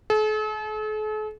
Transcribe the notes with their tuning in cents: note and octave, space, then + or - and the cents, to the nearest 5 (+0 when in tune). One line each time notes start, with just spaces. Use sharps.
A4 -45